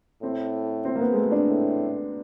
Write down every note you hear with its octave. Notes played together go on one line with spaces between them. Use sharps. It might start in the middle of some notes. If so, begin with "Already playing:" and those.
A2 C4
C4
A#3
B3
G#3
A3
D4
A2